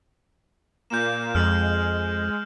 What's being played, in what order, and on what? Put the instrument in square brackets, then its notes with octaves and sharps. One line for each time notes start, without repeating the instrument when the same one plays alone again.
[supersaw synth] A#2 A#3 [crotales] G6 E7
[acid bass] F2 [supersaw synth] G#3 [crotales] F6 F#7